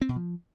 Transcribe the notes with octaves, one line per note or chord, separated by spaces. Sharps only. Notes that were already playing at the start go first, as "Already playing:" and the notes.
C4
B2
F3